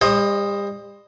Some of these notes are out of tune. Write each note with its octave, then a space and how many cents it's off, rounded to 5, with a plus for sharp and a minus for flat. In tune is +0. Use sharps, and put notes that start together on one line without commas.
G3 +40 C5 +20 D#5 +0